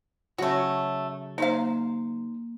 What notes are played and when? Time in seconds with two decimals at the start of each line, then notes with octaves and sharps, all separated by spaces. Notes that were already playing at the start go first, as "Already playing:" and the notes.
0.38 C#3 F#3 A3 C#4 F#4
1.38 A#3 D#4 C5 F5